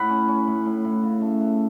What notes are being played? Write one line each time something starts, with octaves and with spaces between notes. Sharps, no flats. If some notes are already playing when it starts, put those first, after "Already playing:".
Already playing: A2 F#5 B5
C#4
C#4
A2
A2
A2
C#3
A3
A3